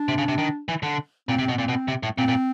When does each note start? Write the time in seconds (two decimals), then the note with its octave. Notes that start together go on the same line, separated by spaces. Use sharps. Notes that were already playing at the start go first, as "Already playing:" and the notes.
Already playing: D4
0.08 C3
0.18 C#3
0.28 C3
0.38 D#3
0.69 E3
0.83 D3
1.29 A#2 C4
1.39 C3
1.49 B2
1.58 A#2 C4
1.69 B2
1.88 C3
2.03 A2
2.18 A#2 C4
2.28 A#2